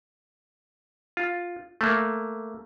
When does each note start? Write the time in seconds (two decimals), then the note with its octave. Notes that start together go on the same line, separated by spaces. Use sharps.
1.17 F4
1.81 A3 A#3